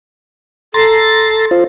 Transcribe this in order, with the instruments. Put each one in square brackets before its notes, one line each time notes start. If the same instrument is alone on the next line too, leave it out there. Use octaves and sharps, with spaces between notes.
[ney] A4 [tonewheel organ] A#5 C6 A6
[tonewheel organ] F4 C5